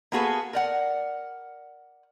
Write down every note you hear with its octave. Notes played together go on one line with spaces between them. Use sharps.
A#3 B3 F#4 G#4 A4 B4
A#4 D5 F#5